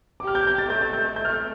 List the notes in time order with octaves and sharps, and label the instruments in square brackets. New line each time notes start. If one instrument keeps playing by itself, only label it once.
[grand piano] D6
[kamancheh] G4 [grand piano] F6
[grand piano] G6
G6
A6
[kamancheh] A3 [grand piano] G6
[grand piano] A6
G6
[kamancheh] A3 [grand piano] G6
[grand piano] F6
G6